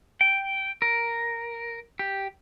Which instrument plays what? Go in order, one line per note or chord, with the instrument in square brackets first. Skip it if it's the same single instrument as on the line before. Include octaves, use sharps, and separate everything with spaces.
[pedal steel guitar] G5
A#4
G4